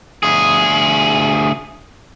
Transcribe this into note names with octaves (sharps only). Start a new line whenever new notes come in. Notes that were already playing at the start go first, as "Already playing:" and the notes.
D2 G#4